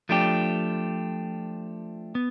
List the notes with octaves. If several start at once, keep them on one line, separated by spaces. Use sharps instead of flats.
F3 A3 D4 G4
B3